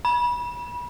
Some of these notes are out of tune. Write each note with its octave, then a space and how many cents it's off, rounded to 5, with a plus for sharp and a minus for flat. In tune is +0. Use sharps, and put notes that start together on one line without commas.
B5 -30